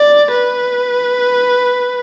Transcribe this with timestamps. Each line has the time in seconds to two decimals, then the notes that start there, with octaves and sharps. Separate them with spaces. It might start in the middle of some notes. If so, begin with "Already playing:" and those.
Already playing: D5
0.31 B4